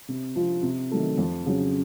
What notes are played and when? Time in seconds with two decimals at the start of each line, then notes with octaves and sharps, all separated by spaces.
0.08 C3
0.35 F3 C4 F4
0.63 C3
0.91 D#3 F#3 A3
1.18 F2
1.46 C#3 F#3